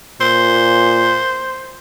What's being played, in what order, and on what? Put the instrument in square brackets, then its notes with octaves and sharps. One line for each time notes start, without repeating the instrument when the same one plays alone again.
[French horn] A#2 [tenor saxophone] C5